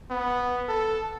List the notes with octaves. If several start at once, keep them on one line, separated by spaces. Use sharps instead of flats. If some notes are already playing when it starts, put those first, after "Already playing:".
B3
A4